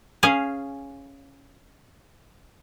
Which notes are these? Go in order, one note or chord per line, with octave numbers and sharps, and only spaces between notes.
C#4 G#4 F5